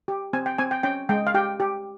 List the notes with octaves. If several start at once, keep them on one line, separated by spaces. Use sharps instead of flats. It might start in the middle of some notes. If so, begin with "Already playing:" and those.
G4
C4 G#5
G5
C4 G#5
G5
C#4 G5
G#3 G5
F5
G4 G5
G4